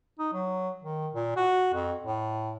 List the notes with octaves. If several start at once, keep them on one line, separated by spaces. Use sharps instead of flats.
D#4
F#3
D#3
A#2
F#4
F2
A2